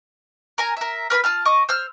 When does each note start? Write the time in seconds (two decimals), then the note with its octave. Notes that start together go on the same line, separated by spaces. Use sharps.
0.58 A#4 G#5 A#5
0.77 A#4 E5
1.10 A#4 B4 G#5 B5
1.24 F4 A5 F6
1.45 D#5 C#6 D6
1.69 C5 E6 F6